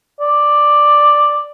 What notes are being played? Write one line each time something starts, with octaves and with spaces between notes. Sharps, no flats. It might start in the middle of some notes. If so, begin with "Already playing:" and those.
D5